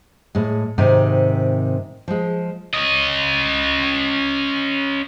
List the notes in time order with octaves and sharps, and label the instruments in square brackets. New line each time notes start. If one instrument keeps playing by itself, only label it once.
[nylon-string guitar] A2 G#3
G#2 C3 D#3
F3 G#3
[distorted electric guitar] C#4 D#5